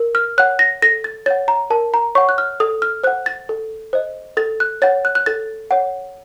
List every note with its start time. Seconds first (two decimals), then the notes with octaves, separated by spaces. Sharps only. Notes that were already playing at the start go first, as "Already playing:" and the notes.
Already playing: A#4
0.15 F6
0.38 C#5 F#5 F#6
0.59 A#6
0.82 A4 A#6
1.04 A6
1.26 C#5 A6
1.30 F#5
1.48 A#5
1.70 A#4 A5
1.94 A#5
2.15 C#5 F#5 C#6
2.29 F#6
2.38 F6
2.60 A4 D#6
2.82 F6
3.04 C5 F#6
3.07 F#5
3.26 A6
3.49 A4
3.93 C5 D#5
4.37 A4 A6
4.60 F#6
4.82 C#5 F#5 A6
5.05 F#6
5.15 F#6
5.26 A4 A6
5.71 C#5 F#5